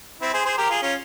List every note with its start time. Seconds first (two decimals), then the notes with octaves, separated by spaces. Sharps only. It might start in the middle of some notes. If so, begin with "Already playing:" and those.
0.21 C4 E4
0.34 G#4 C5
0.45 G#4 C5
0.58 G4 A#4
0.70 F4 G#4
0.82 C#4 F4